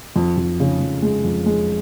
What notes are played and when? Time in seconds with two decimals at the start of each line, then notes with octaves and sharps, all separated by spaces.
0.16 F2
0.37 F2
0.60 C#3
0.80 F2
1.02 G#3
1.24 F2
1.46 G#3